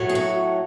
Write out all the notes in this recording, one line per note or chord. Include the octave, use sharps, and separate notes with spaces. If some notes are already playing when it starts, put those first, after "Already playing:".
Already playing: A2 F#3 A3
G#4
F#4